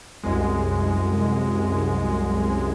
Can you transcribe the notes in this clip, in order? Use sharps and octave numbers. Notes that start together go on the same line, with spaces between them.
C2 F#2 G#3